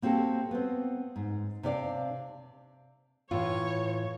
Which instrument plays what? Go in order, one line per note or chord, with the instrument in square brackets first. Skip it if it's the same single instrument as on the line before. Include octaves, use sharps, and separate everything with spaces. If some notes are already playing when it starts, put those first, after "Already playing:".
[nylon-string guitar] A#3 C4 F#4 G4 A4
B3 C4
G#2
C3 D4 D5 F5
[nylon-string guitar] A2 E3 F4 [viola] C#5